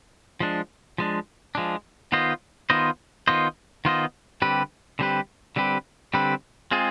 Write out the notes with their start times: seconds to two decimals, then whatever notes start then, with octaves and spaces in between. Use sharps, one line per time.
0.40 F3 G#3 D4
0.98 F3 G#3 D4
1.55 F3 G#3 D4
2.12 D#3 B3 F4 C5 D#5
2.70 D#3 B3 F4 C5 D#5
3.28 D#3 B3 F4 C5 D#5
3.85 D#3 B3 F4 C5 D#5
4.42 D3 G3 C4 G4 B4
4.99 D3 G3 C4 G4 B4
5.56 D3 G3 C4 G4 B4
6.13 D3 G3 C4 G4 B4
6.71 G#3 C4 F4 G#4